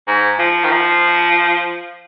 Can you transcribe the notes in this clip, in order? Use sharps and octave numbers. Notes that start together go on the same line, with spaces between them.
G#2
F3
D#3
F3